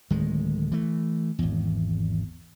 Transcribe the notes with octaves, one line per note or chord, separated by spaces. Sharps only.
D1 D#3 G#3
E3 A3
G#1 E2